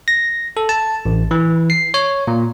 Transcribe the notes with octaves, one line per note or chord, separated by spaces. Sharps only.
A#6
A4
A5
A1
E3
C7
C#5
A#2